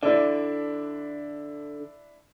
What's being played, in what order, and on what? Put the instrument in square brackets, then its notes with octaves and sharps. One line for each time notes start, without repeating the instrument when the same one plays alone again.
[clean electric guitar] D3 [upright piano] D4 E4